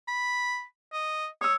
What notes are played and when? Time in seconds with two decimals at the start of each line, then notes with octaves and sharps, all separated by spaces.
0.08 B5
0.93 D#5
1.41 C#5 D#6 E6